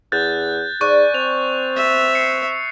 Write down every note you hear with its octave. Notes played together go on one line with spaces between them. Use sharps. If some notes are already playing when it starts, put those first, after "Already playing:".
E2 F#6 G6 A6
G#2 D5 G#5 C#6 F#6
C4 F7
E5
C7 C#7